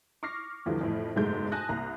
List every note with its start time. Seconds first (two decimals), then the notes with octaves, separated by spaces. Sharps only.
0.23 C#6 D6 F6 A#6 C7
0.66 E2 D3 E3 F3 G3
0.81 F2 A2
1.15 F#1 B1 G#2 G#3 A3 G6
1.52 G#5 A5 D#6 F#6 A#6
1.69 C2 A#3 A#5